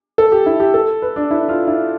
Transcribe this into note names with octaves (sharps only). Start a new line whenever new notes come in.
A4
G4
E4
G4
A4
B4
D4
E4
F4
E4